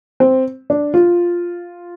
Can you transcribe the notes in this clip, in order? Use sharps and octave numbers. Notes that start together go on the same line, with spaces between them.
C4
D4
F4